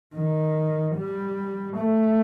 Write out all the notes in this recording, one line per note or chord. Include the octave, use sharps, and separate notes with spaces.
D#3
G3
A3